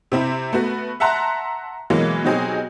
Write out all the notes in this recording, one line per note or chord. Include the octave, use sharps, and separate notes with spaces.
C3 C4 E4
A3 B3 F#4
E5 F#5 A5 A#5 C6 F#6
B2 E3 F#3 G#3 A#3
B2 F#3 C4 D#4 G4 G#4